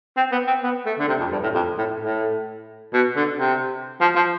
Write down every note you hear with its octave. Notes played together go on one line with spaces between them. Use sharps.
C4
B3
C4
B3
A3
D3
C3
F2
G2
A2
F2
A2
A2
B2
D3
C3
F3
F3